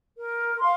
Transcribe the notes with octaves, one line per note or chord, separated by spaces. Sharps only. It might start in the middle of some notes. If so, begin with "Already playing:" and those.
A#4
F5 C6